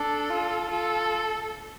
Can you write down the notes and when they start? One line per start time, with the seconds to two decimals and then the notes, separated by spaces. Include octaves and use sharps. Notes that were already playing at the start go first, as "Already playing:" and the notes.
Already playing: D4 A4
0.30 F4
0.70 F4 A4